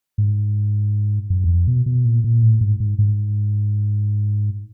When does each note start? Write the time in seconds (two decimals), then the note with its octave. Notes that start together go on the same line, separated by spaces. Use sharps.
0.18 G#2
1.30 F#2
1.44 E2
1.49 F2
1.67 B2
1.86 B2
2.05 A#2
2.24 A#2
2.42 A2
2.61 G#2
2.80 G#2
2.99 G#2